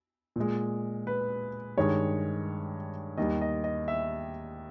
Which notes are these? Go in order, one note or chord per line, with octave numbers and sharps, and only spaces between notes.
A#2 G#3
B4
G2 D#3 G#3 C#5
D#2 D#3 G3 D#5
D#5
D#5
E5